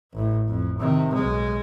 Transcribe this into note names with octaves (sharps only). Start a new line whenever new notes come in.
A1 A2
F2
C3 D#3
B1 G#3